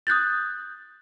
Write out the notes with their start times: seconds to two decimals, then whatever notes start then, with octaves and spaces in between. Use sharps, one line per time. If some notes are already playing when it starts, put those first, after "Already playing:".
0.07 D#6 F#6 G6 A6